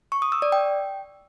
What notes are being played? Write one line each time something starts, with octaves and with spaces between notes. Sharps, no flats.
C#6
D#6
E6
D5
G5